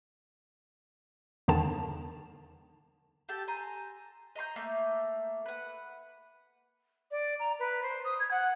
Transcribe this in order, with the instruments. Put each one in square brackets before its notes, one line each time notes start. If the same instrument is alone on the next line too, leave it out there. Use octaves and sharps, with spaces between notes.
[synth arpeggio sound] E2 D3 D#3 A5
[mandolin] G4 A4 G5 A5
G#5 A#5 C6
D#5 A#5 C6 G6
A3 A#3
B4 F#5
[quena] D5
A#5
B4
C5
D#6
G#6
F#5